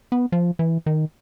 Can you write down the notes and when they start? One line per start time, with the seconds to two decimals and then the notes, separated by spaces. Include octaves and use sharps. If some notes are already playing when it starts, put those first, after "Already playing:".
0.12 B3
0.32 F3
0.59 E3
0.86 D#3